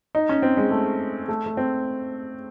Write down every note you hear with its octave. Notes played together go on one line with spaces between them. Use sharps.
D#4
C#4
C4
G#3
A3
A3
A3
C4